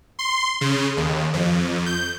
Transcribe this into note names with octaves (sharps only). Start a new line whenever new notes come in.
C6
C#3
D#2
F2
G6